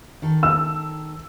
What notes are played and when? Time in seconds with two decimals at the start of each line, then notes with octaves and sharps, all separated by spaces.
0.22 D#3 A4
0.43 E6